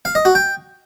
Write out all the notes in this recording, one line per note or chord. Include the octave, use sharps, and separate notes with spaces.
F5
D#5
F#4
G5